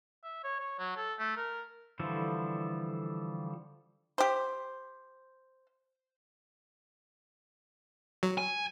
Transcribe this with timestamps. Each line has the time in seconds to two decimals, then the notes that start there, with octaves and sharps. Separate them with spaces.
0.24 E5
0.44 C#5
0.61 C#5
0.79 F#3
0.97 A4
1.19 A3
1.37 A#4
1.99 D3 E3 F3 G3 A4
4.18 G4 C5
8.23 F#3
8.38 G#5